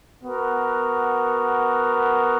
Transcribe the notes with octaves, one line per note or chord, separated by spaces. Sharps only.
B3 F#4 A#4